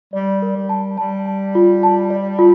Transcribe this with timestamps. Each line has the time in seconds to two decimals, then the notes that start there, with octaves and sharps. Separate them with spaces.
0.13 G3 D5
0.42 A#4
0.56 G3
0.69 A5
0.97 G3 A5
1.26 A5
1.55 F4
1.83 A5
2.10 D5
2.39 F4